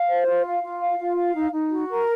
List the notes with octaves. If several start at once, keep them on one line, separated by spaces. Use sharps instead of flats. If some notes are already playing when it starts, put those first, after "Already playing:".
Already playing: F5
C5
F4
F5
F4
F5
F4
F5
D#4
D#4
F#4
A#4